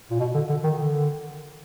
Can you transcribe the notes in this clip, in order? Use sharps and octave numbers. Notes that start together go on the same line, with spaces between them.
A#2
B2
D3
D3
D#3
D3